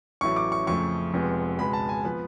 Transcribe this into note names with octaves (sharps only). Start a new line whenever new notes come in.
A1 A2 F#3 A3 C#6
D6
C#6
F2 C#3 F3 A3 C#6
F1 F2 F3 G#3 B3
C#2 B2 G#3 B3 B5
A5
G#5
F3 B3 B4